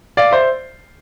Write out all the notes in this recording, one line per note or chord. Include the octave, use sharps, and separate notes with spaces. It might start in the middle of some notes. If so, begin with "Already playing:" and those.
D5 F5
C5 E5